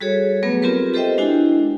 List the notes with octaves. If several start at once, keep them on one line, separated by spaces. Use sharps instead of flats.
G3 F#4 G#4 A4 C#5
F#3 A3 B3 G#4 B4
C4 F4 G4 A#4 B4
G4 A4 C5 D#5 E5 G5
G#3 D4 E4 F#4 G#5